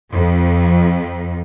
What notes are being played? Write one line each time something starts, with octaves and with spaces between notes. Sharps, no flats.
F2